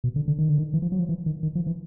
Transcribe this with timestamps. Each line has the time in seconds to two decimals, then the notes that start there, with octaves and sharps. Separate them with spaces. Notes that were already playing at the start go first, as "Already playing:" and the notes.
0.04 B2
0.16 D3
0.28 D3
0.39 D#3
0.49 D3
0.58 D#3
0.74 E3
0.82 F3
0.92 F#3
1.00 F3
1.09 E3
1.26 D#3
1.43 D#3
1.55 F3
1.67 E3